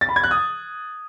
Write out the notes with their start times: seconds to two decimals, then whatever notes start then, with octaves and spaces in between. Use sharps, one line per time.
0.01 A6
0.09 B5
0.16 G#6
0.24 F#6
0.31 D#6